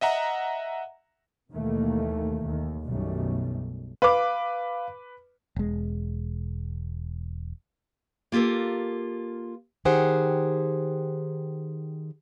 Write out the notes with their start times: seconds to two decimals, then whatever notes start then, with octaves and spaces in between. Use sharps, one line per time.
0.01 D#5 E5 F#5 A#5
1.52 D#2 B2 D#3 E3 A3 A#3
2.45 D#2
2.85 B1 F#2 B2 D#3 G3 A3
4.02 B4 F5 D6
5.56 E1 G#3
8.32 A#3 F4 G4 A4 A#4
9.85 D#3 G4 G#4 C5 F#5